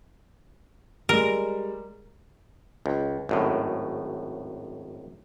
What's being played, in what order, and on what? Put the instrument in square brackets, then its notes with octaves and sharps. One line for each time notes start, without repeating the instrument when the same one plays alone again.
[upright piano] G3 G#3 [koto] A#4
[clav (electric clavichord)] C#2
G#1 F#2 A2